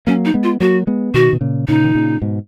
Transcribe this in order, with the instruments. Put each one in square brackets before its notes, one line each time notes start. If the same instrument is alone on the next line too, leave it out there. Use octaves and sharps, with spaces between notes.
[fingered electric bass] F#3 A#3 [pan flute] C#4
[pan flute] D#4
[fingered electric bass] G#3 B3
[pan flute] F4
[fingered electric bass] F#3 A#3 [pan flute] F#4
[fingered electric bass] G#3 B3
[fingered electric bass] B2 D#3 [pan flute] F#4
[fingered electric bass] B2
A#2 C#3
[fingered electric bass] A#2 C#3 [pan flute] D#4
[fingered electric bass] D#3
A#2 C#3
G#2 B2